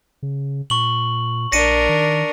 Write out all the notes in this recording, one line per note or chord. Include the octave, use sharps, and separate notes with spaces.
C#3
A#2 C#6 F#7
A#1 D4 A#4 A#6 C#7 D#7
D#3